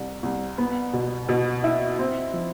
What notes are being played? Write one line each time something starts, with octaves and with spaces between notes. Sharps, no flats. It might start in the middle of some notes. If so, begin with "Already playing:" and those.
Already playing: C2
C2
B3
B2
B2
E4
C4
F3